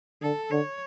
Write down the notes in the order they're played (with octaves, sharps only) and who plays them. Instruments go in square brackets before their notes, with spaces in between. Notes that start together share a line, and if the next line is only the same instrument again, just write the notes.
[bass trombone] D3 [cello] A4
[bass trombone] D3 [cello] C#5